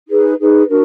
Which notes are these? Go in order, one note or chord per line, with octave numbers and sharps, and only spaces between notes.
D#4 G#4 B4
D#4 G#4 B4
D4 F#4 A#4